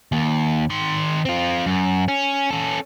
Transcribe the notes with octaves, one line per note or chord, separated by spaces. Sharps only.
D#2
D#3 C6
C4 F4
F#2
C#4
C#4 A4